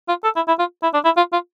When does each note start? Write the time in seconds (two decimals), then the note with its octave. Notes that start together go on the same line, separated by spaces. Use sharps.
0.08 F4
0.24 A4
0.36 E4
0.48 E4
0.59 F4
0.83 E4
0.94 D4
1.05 E4
1.17 F4
1.33 F4